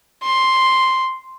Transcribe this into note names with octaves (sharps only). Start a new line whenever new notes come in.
C6